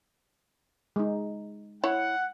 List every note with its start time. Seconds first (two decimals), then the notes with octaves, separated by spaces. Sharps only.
0.96 G#3 D#4
1.84 E4 C#5 F#5